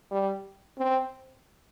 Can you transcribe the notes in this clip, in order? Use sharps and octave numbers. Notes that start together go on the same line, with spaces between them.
G3
C4